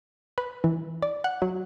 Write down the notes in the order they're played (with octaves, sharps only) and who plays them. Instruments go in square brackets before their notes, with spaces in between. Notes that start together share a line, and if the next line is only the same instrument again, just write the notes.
[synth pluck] B4
E3
D5
F#5
F#3